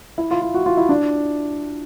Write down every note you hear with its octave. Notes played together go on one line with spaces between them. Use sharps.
E4
F4
F4
F#4
F4
E4
D4